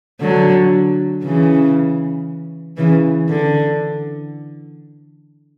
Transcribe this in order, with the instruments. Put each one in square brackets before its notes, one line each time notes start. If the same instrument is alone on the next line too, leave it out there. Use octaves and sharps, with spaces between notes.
[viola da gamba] D3 F#3
C#3 E3
C#3 E3
D3